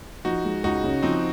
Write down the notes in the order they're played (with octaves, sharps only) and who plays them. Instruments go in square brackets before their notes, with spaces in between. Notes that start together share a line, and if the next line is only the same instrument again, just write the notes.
[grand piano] F3 [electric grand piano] D#4 F#4
[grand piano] G#3
[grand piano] C#2 [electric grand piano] D#4 F#4
[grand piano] C#3
[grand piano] F3 [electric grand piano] C4 D#4